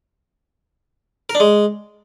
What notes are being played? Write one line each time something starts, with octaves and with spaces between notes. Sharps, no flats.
A#4
D4
G#3